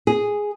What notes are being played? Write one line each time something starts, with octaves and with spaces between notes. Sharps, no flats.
G#4